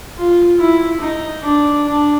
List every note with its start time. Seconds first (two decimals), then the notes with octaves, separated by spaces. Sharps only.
0.18 F4
0.60 E4
1.01 D#4
1.43 D4
1.86 D4